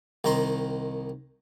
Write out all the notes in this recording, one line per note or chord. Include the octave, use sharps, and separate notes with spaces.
C2 D#3 A#5 C6